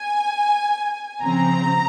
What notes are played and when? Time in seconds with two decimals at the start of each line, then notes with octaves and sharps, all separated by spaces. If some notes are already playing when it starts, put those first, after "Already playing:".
Already playing: G#5
1.22 C#3 F3 C4 A#5